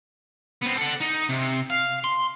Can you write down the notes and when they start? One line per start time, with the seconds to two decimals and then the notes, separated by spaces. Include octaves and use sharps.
0.62 B3 C4
0.78 A4 F#5
1.00 D#4
1.29 C3
1.70 F5
2.04 C6